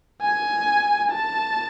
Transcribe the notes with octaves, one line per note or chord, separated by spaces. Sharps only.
G#5
A5